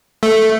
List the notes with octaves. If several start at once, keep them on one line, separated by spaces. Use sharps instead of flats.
A3